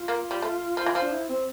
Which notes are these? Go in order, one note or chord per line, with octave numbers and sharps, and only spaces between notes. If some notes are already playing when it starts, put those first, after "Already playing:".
Already playing: F4
A#3
G3
A3
F3
E3
F3
D4
E4
C4